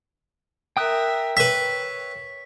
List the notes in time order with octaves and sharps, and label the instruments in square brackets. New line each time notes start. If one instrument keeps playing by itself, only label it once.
[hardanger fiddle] A#4 E5 [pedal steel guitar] G5 D#6 F#6
[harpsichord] B4 E5 [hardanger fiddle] C#5 [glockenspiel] B6